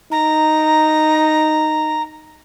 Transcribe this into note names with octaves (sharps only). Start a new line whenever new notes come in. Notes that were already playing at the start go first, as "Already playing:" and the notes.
D#4 A#5